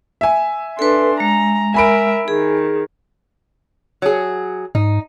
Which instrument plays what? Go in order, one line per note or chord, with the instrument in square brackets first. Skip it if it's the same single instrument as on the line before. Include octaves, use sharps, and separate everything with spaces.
[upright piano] E5 G#5
[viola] D4 C6 [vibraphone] A4 B4
[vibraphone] G#3 [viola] A#5
[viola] A#4 E5 [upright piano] G#5 B5 D7
[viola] D#3 [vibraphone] G#4
[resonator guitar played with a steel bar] F#3 G#4
[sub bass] G#2 [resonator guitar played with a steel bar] D#4